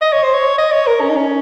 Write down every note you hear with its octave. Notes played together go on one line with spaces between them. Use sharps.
D#5
C#5
C5
C#5
D#5
C#5
A#4
C#4
D#4
C#4